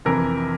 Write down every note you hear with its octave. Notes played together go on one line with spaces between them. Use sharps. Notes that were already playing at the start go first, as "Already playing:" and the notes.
F2 C3 E3 A#4